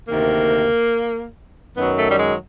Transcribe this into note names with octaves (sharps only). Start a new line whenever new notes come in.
D2 C3 D#3 A#3
F#2 D#3 F#3 B3
A3
G3
G#3